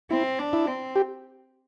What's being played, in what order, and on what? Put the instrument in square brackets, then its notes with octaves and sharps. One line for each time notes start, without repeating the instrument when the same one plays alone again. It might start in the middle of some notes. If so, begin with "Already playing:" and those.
[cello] C4 [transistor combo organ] E4
[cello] D4
[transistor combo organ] E4
[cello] C4
[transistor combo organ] G4